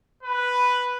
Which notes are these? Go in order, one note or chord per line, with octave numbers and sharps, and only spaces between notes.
B4